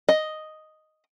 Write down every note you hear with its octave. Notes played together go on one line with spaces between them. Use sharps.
D#5